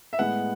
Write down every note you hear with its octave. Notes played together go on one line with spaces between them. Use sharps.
E5
A2 G#3 B3 F#5